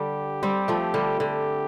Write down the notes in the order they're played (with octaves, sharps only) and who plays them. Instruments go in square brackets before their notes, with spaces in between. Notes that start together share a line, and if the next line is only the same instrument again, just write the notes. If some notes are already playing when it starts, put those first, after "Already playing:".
Already playing: [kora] D3 G3 [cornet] G4
[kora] G3 C4
F3 A3
D3 G3
[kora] D3 [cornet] G4